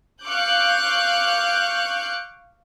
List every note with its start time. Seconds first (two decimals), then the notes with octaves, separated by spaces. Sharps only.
0.23 F5 C#6 D6 F#6 G6